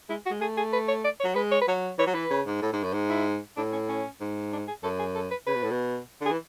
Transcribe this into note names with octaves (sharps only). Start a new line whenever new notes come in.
G#3 E4
F#4
G#3
A3 G#4
G#4
B4
C#5
D5
C#5
F#3
G#3 B4
C#5
B4
F#3 C#5
E3 C#5
F#3
E3 B4
C#3
G#2
A2
G#2
F#2
G#2
E4
A2 D4
C#4
C#4
G#2
D4
G#4
F#2 A4
G#4
A4
B4
C#3 B4
B2
A2
B2
D3
G#4
E3